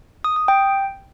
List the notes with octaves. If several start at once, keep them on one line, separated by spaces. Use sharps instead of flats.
D#6
D#6
G5